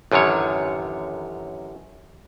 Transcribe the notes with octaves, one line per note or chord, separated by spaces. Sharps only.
A1 F#2 D3 D#3 C#5